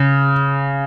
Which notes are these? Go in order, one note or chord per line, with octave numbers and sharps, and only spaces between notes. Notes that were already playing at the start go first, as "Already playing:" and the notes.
Already playing: C#3